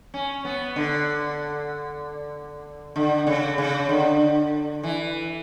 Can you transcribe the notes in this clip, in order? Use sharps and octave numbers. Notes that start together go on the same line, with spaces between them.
C#4
B3
D3
D3
C#3
C#3
D3
E3